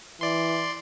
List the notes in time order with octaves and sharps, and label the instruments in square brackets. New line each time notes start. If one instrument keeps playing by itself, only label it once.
[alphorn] E3 [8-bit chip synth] D5 C6